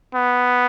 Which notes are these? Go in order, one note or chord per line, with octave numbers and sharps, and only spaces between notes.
B3